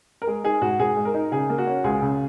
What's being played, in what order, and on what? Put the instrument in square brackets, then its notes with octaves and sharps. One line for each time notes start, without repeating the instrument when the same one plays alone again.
[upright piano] A#4
G#3 G#4
D#4 G#4
G#2 F#4
G#2 G#4
G#3
A#4
D#4
C#3 G#4
A#3
F#4
C#4
C#2 G#4
C#3